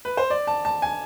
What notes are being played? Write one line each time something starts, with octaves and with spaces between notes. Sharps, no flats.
B4
C5
D5
A5
A5
G#5